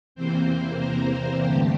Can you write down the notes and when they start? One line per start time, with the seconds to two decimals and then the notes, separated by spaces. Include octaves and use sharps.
0.15 E2 C3 E3 A#3 C4 C5
0.79 A#3 A#4
1.44 G2 D3 A3 G4